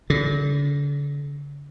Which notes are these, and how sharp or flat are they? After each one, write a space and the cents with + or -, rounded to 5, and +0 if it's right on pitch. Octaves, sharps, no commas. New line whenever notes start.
D3 -40